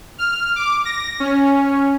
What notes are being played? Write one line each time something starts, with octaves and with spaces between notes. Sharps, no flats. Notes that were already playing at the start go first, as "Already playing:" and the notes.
F6
D6
A#6
C#4